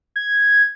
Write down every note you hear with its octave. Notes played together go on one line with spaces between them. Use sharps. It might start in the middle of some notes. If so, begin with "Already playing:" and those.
G#6